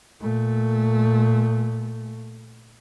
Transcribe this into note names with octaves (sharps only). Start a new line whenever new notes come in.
A#2 A3